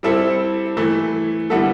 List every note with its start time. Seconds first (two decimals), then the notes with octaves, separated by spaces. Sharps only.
0.03 G3 C4 E4 A4
0.77 E3 A3 E4
1.50 D3 G3 B3 E4 A4